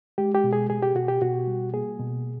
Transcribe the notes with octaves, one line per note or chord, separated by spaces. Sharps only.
G#3 G4
G4
B2
G#4
B2 G#4
G4
B2 F#4
G4
B2 F#4
G3
A#3 G#4
B2